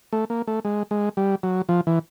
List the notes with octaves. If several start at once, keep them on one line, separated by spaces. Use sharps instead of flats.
A3
A#3
A3
G#3
G#3
G3
F#3
F3
E3